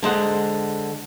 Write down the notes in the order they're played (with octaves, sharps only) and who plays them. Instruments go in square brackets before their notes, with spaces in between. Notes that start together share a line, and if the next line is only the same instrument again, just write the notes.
[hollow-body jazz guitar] D3 G#3 C5 F#5